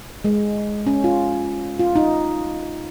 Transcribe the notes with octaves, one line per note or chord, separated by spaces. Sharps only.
G#3
C#4
F4
F4
D#4